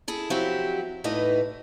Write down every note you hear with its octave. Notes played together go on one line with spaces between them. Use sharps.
E4 G#4 A4
F3 F#3 C4 E4 F#4 G4
E2 A2 E3 D#4 B4 D#5